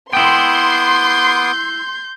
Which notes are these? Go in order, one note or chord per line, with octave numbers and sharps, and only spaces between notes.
B3 E4 G5 C6 D6 D#6 G6